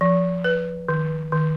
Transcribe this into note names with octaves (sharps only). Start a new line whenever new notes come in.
F3
B4
D#3
D#3